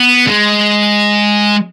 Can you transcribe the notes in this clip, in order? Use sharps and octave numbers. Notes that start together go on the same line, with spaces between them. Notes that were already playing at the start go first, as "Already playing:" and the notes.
Already playing: B3
G#3